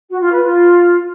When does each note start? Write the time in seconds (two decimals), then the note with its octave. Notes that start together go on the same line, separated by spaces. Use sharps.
0.09 F#4
0.21 F4
0.32 B4
0.44 F4